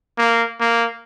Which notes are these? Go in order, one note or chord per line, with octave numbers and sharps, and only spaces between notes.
A#3
A#3